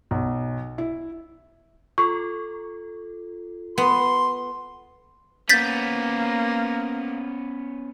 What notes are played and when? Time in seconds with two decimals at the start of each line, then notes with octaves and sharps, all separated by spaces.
0.11 B1
0.78 E4
1.98 F4 A4 C#6
3.78 B3 C6
5.49 A#3 B3 C#4 G6 A6 B6